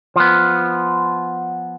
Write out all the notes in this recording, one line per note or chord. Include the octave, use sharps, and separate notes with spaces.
F3 B3